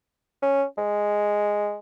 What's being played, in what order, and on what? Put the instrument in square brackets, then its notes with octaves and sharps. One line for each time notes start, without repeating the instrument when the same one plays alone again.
[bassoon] C#4
G#3